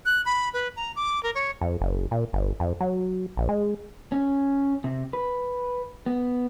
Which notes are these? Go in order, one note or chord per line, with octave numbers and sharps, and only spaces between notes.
F#6
B5
B4
A#5
D6
A#4
C#5
F2
F#1
A#2
G1
F2
F#3
A#1
G#3
C#4
C3
B4
B3